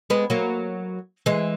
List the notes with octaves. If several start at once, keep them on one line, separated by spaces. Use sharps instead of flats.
G#3 B3
F#3 A#3
E3 G#3